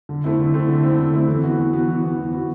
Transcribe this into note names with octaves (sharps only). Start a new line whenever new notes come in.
D3
A3 C4 E4
D3
A3 C4 E4
D3
A3 C4 E4
D3
A3 C4 E4
E3
B3 F#4
E3
B3 F#4
E3
B3 F#4
E3
B3 F#4